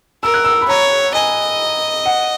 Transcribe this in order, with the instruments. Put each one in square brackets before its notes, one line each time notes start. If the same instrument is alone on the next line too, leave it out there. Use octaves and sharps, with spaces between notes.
[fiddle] A#4 [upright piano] E6
[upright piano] F#6
E6
B5
[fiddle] C#5 [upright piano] A#5
[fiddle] D#5 [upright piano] G#5
[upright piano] F#5